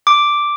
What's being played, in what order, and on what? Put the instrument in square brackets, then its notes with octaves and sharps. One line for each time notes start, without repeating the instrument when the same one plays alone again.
[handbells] D6